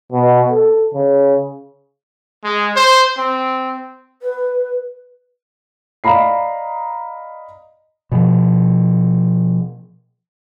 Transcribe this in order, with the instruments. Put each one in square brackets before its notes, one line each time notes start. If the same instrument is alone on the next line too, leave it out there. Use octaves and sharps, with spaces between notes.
[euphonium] B2
A4
C#3
[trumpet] G#3
C5
C4
[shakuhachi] B4
[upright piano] D5 D#5 F5 A#5 B5 C7
[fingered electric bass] B2 F3